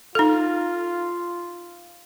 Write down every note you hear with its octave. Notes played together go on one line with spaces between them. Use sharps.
D#4 F4 A4